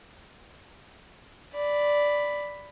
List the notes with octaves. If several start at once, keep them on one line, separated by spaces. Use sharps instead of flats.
D5 B5